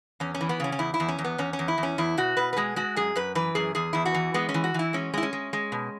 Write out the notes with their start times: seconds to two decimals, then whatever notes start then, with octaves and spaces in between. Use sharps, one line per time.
0.20 E2 C#4
0.34 C#4
0.41 E3
0.49 B3
0.60 C#3 C#4
0.72 C#4
0.79 E2 E4
0.94 E4
1.00 E2
1.08 C#4
1.18 E2
1.24 B3
1.38 E2 C#4
1.53 C#4
1.59 E2
1.68 E4
1.78 E2
1.83 C#4
1.98 E2 E4
2.18 B2 F#4
2.37 B2 B4
2.53 B4
2.57 G#3 G#4
2.76 G#3 F#4
2.96 F#2 G#4
3.16 F#2 B4
3.35 E3 B4
3.55 F#2 G#4
3.75 E2 G#4
3.93 E2 E4
4.05 F#4
4.14 E3
4.34 G#3 B3
4.49 C#4
4.54 E3
4.64 F#4
4.74 E3 E4
4.93 G#3 C#4
5.13 G#3 E4
5.23 C#4
5.33 G#3
5.53 G#3
5.72 B2